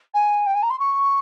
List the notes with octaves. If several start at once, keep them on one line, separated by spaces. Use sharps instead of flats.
G#5
G5
G#5
A#5
C6
C#6